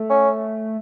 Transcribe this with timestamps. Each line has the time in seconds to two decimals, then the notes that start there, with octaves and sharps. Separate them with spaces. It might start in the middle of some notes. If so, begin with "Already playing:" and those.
Already playing: A3
0.10 C#4